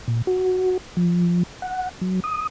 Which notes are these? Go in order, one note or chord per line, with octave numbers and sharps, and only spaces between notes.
A#2
F#4
F3
F#5
F#3
D#6